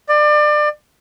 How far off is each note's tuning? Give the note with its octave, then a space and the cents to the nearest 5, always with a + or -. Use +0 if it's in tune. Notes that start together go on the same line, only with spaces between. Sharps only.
D5 +30